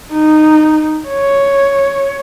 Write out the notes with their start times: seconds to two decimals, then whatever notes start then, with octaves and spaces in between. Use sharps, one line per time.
0.12 D#4
1.08 C#5